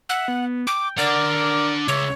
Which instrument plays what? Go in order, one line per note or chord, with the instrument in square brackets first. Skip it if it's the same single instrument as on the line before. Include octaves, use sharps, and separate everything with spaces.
[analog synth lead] E5 [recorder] F#5
[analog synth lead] B3
[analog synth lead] G5 [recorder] D6
[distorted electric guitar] D4 F#5 [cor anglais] A#4 [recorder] D5 [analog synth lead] D6
[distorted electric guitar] C#2 [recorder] C#5 [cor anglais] E5